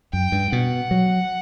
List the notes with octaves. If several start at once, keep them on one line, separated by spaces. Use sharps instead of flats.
F#2 G5
G2
B2 F#5
F#3